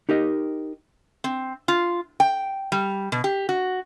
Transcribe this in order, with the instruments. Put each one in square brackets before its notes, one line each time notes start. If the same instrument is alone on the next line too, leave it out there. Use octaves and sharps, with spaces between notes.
[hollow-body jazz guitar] D#4 G4 A#4 D#5
[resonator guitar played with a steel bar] C4
F4
G5
G3
B2
G4
F#4